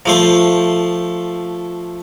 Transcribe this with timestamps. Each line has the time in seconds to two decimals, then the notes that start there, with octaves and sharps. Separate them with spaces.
0.06 F3 A3 C5